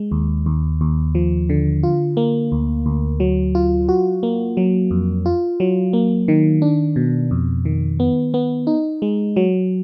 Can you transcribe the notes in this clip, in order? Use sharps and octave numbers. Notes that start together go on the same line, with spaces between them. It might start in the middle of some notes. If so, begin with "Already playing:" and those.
Already playing: G#3
D#2
D#2
D#2
F3
D3
F4
A#3
D2
D2
F#3
F4
F#4
A#3
F#3
F2
F4
F#3
A#3
D#3
D4
B2
F2
D#3
B3
B3
D#4
G#3
F#3